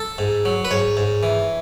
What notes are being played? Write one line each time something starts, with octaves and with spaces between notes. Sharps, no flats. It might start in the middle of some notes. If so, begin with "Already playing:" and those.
Already playing: A4
G#2
F#3
B4
G#2 C#5
G#2
E3